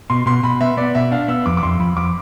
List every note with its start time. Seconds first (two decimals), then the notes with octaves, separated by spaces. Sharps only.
0.10 B2 C6
0.26 B2 C6
0.43 B2 B5
0.61 B3 E5
0.77 B3 D5
0.95 B2 E5
1.12 D4 F5
1.28 B3 E6
1.46 F2 D6
1.57 D6
1.63 F2 C6
1.80 F2 B5
1.97 F2 D6